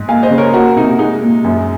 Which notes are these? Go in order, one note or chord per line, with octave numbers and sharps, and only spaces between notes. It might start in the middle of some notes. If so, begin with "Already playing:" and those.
Already playing: G#2
A#3 F5 G#5
C5 D#5
C#3
A#4 C#5
A#3 F#4 A#4
C3 D#4
G#3 D#4
A#2
F#2